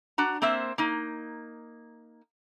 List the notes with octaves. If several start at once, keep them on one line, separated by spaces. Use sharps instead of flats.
D4 F#4 A#5
A#3 C4 C5 E5
A#3 D#4